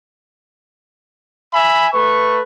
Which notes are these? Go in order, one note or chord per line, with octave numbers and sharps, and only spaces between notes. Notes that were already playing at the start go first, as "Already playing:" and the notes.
E5 G#5 B5
A3 B4 C#6